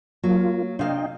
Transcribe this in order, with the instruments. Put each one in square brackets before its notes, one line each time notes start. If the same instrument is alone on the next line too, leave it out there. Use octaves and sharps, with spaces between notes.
[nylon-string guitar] F#3 [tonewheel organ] A#3 F4
[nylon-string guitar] C3 F5 [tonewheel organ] D4 D#5 G5